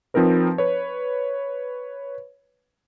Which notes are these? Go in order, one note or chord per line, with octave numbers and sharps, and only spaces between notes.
F3 C4 D#4 A#4 B4
B4 C#5